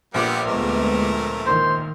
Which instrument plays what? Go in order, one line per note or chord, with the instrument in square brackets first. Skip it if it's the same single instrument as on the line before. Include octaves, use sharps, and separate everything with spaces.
[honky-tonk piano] A#1 A#2 D6 [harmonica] G3 B3 G5
[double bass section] D2 G#3 B3 [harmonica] A3 A#4
[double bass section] D#3 [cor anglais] C5